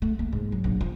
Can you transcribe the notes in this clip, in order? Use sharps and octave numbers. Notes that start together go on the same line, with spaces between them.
A3
A#3
G#2
F#3
A#1
F3